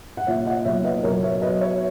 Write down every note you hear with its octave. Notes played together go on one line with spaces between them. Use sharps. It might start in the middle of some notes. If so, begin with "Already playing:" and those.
F#5
A#2 C#5 E5
D#5 F#5
B1 C#5 E5
B4 D#5
B1 A#4 C#5
C#5 E5
F#3 B4 D#5
C#5 E5